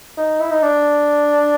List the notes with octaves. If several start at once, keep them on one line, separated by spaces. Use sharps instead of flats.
D#4
E4
D#4
D4